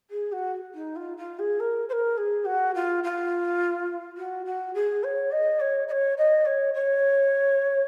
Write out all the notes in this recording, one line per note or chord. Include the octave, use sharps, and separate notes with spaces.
G#4
F#4
D#4
F4
F4
G#4
A#4
C5
A#4
G#4
F#4
F4
F4
F#4
F#4
G#4
C#5
D#5
C#5
D#5
C#5
D#5
C#5
C#5